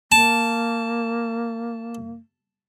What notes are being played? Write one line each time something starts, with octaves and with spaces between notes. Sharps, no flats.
A#3 A5